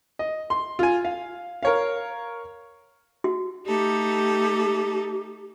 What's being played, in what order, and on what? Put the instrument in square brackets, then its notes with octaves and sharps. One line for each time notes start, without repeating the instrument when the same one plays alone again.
[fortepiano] D#5
C6
F4 G#5
F5
A#4 C#5 F5
[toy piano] F#4
[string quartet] A3 D#4 A4 [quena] G4